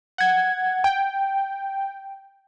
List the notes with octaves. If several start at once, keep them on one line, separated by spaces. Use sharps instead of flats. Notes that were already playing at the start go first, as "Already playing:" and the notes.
F#5 G#6
G5